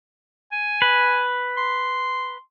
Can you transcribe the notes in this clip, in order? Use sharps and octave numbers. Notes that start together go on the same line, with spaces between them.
G#5
B4
C6